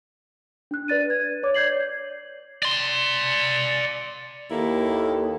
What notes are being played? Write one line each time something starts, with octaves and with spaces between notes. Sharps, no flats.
D4 F#6
B4 D5 A6 D#7
G#6
C#5 D6
D5 G6 G#6 C7 F#7
D5 C6
D#2 A#3 E4 A4